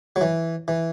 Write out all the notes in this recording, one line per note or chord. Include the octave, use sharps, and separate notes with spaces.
F#3
E3
E3